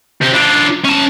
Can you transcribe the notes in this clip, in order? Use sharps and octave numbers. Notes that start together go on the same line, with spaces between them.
C3 G4
D4 F4
C#4 A5